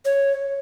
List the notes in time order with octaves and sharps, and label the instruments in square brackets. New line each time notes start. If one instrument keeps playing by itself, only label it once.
[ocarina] C#5